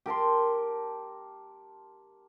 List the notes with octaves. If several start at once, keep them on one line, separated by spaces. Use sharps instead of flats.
G4 A#4 A5 C6